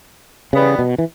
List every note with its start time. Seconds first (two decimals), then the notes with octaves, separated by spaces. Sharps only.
0.53 C#3 E3 G3 B3
0.79 B2
0.98 E3